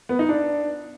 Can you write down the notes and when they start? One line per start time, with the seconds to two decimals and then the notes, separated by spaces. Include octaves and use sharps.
0.09 B3
0.19 D#4
0.29 D4